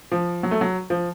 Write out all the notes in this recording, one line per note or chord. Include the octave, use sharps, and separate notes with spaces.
F3
F#3
A3
F#3
F3